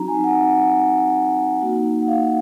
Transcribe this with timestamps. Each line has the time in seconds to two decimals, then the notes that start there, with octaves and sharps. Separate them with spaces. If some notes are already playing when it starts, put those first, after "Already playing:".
Already playing: F#3 C4 D#4 F#4 A#5
0.08 G#5
0.24 F#5
1.62 A#3 D#4 F#4
2.02 F#5
2.08 F5